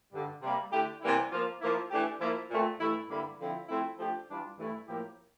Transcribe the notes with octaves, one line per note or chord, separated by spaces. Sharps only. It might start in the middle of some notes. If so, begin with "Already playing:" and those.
G2 D3 G3
C3 G3 A#3
D3 A3 E4 G4
C3 E3 G3 A#3 E4
F3 A#3 F4
F3 A#3 E4
E3 A3 D4 G4
F3 A#3 E4
A#2 A3 C4
G2 E3 A3 E4
G2 D3 G3 A#3 E4
D3 F3 C4 E4
F3 A3 C4 E4
F3 A3 D4 G4
E3 G3 D4 F4
G2 E3 A3 E4
A2 F3 A#3 E4 G4